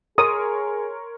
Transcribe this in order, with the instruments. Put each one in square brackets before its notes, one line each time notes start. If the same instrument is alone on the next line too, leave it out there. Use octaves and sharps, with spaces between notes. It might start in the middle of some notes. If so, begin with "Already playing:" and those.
[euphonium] G#4 [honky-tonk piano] A#4 C#5 C6 [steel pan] D#6